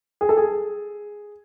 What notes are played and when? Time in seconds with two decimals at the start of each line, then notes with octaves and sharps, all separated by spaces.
0.21 G#4
0.29 A4
0.37 G#4